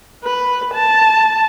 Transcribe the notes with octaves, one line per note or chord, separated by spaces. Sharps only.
B4
A5